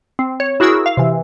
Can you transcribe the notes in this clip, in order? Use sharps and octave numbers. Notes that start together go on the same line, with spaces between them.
C4
C#5
E4 F#4 G#4 A#4 C#6 E6
F5
C3 E3